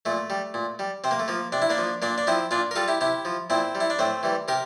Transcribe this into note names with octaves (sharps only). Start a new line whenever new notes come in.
A#2 A3
G3
A#2
G3
C3 C4
A#3
A3
F3 A#3
C3 D4
E4
A#3 D4
F3
A#2 A#3 D4
D4
F3 C4 E4
A#2 D4 F4
A#4
G3 F4 A4
E4 G4
C3 E4 G4
F3
A#2 C4 E4
G3
E4
D4
A2 A3 C4
E3 G3
C3 G4 A#4